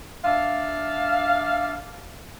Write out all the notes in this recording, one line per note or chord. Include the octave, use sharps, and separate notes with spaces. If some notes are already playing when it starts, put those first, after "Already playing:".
D4 E5 F5